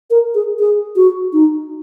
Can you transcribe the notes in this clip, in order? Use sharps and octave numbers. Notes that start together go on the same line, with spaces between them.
A#4
G#4
G#4
F#4
D#4